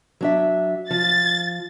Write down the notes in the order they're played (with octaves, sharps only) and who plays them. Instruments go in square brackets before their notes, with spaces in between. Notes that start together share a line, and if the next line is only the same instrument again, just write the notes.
[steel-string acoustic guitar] F#3 D4 E5
[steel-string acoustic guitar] F3 [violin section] A6